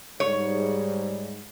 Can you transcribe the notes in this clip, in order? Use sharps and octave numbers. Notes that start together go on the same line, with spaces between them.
G#2 G3 C#5